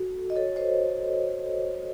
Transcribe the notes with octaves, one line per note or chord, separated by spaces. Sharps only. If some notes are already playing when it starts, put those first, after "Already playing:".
Already playing: F#4 A4
D#5
A4 C#5
C5 D#5